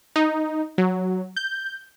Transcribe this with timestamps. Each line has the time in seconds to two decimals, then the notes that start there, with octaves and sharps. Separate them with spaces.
0.16 D#4
0.78 F#3
1.36 G6